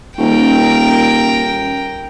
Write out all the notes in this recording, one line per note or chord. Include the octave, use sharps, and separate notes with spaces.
D#1 C#4 A#4 G5